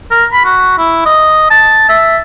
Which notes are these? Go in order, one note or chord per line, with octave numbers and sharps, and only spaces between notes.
A#4
B5
F#4
E4
D#5
A5
E5